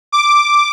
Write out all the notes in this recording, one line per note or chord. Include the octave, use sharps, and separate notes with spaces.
D6